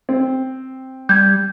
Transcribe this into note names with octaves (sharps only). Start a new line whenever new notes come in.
C4
G3 G6 G#6